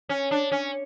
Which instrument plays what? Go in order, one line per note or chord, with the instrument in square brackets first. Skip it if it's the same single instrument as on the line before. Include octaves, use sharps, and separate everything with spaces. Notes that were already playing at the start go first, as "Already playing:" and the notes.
[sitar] C#4
D4
C#4